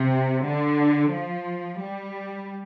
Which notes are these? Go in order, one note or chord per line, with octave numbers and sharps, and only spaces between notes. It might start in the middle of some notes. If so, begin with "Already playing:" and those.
Already playing: C3
D3
F3
G3